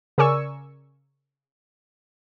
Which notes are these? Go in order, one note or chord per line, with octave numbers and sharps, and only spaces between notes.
C#3 A#4 D5 G#5 C#6 E6